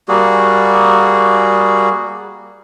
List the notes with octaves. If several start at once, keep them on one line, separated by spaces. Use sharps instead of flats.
G3 A#3 F#4 G#4